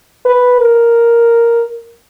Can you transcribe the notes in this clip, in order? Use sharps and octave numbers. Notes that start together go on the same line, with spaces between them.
B4
A#4